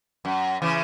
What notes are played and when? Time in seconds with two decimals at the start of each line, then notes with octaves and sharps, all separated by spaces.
0.25 F#2
0.62 C#3 E3